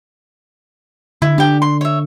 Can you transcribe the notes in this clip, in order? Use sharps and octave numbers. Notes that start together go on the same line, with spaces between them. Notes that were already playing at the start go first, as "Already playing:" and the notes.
D3 E4
D4 G4 G5
C6
C#5 E5